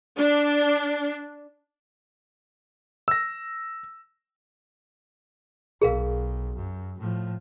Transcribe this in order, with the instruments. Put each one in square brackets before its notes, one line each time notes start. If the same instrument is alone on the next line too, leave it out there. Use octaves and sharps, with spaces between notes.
[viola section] D4
[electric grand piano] E6 A#6
[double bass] B1 [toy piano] G#4 A#4 F5
[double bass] F#2
A2 F3